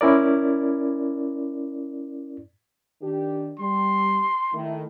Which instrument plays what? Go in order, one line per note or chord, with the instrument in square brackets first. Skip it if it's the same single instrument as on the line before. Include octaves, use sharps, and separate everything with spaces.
[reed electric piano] C#4 E4 A#4 D5
[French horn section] D#3 D4 G4
[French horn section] G3 [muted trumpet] C6
[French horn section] D#3 A3 E4